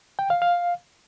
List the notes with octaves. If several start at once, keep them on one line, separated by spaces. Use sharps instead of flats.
G5
F5
F5